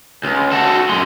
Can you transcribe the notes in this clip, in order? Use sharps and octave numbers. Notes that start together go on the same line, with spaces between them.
C#2
F#4 A4
F#2 G#3